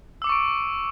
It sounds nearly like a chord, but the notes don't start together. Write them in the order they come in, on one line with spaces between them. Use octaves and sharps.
E6 D6 C#7 C#6 D7